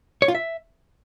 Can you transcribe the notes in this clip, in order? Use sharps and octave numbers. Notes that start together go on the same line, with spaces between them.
C#5
F4
E5